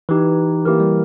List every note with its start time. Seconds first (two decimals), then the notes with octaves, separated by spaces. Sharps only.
0.09 E3 D#4 G4 B4
0.65 E3 A#3 E4 G4 A#4
0.80 G3